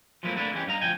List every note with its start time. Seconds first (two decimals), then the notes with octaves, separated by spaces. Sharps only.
0.23 F3 F#3 A3 A#3 E4
0.35 A3 A#3 D4 E4 B4
0.52 E3 G3 G#3 C#4 G4
0.66 G2 D#4 F5 A#5
0.81 D2 F3 G5 G#5